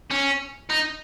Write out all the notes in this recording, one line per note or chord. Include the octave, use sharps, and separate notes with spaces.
C#4
D#4